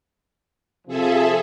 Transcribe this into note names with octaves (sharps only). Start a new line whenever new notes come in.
C3 F3 G#4 A4 E5